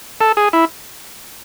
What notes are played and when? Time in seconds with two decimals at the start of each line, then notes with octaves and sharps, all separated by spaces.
0.21 A4
0.37 G#4
0.53 E4